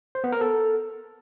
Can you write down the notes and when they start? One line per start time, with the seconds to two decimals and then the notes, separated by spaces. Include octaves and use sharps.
0.15 C5
0.24 B3
0.32 A#4
0.41 A4